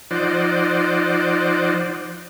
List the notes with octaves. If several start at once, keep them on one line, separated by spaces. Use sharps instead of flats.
F3 D#4 C5 D5 F#5